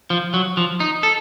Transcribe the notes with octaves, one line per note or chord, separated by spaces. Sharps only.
F3
F#3
F3
D#4
A4